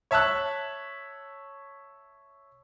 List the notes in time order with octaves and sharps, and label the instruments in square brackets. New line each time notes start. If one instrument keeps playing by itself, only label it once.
[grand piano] C#5 E5 A5 E6 F#6